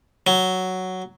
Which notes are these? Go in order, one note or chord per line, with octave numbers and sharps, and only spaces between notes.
F#3